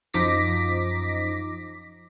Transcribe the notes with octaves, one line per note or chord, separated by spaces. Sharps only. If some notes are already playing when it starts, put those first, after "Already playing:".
F#2 F3 D#4 D6 A#6 B6